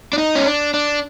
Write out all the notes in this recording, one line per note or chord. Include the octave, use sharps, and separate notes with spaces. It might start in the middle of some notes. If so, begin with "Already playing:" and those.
D4
D#4
C#4
D4
D4